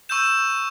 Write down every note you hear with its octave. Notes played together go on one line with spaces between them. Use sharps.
C#6 E6 G6 E7